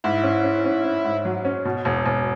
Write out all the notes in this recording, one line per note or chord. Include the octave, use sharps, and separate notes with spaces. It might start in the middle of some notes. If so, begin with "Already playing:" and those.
G#2 E4
C#4
C#4
C#4
C#4
G#2
F#3
C#4
B2
E1
E1